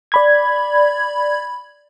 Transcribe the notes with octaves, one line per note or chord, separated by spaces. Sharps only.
D5 B5 G#6